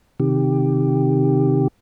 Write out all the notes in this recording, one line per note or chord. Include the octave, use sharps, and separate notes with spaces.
C3 D#3 G4